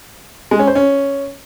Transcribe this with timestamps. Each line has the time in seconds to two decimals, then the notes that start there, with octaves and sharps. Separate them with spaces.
0.51 G#3
0.59 C#4
0.67 C5
0.75 C#4